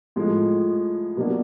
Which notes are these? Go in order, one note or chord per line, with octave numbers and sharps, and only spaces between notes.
A2 F3 G#3
B2 F#3 A#3 D4 F#4